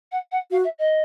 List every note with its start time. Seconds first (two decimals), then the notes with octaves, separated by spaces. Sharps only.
0.11 F#5
0.31 F#5
0.51 F#4 F5
0.64 E5
0.78 D#5